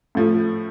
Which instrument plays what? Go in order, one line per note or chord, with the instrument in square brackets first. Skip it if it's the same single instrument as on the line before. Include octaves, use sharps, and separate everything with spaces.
[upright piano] A2 F3 A3